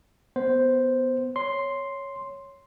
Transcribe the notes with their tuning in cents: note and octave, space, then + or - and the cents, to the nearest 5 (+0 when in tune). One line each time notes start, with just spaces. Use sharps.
B3 +10 C5 +0
C#5 +0 C6 +0